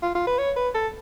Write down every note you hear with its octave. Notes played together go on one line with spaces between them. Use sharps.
F4
F4
B4
C#5
B4
A4